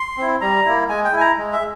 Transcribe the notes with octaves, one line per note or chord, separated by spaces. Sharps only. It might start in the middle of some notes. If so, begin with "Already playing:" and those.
Already playing: C6
C4 E4
G3 A#5
A#3 E4
G#3 G#5
G5
E4 G#5
A#5
G#3
E5